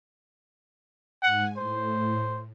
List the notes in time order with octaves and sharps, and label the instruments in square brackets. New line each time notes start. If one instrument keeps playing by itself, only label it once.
[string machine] G#2 G#5 [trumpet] F#5
[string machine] A2 [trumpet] C5